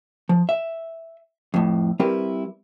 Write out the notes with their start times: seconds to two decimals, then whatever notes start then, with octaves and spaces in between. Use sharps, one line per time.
0.29 F3
0.49 E5
1.54 F2 A2
2.00 G3 C4 E4 G4 A#4 B4